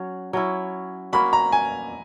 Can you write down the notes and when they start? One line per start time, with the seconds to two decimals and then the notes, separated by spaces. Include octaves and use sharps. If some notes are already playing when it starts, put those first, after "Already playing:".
Already playing: F#3 C#4
0.33 F#3 C#4 E4
1.13 A#3 C#4 F#4 B5
1.33 A#5
1.52 G#5